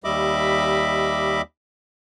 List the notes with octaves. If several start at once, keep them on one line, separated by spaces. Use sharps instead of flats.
D#2 G3 D#5 E5 B5 D6